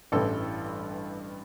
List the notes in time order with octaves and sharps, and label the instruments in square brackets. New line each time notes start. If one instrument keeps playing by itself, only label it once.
[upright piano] A1 G2 E3 A4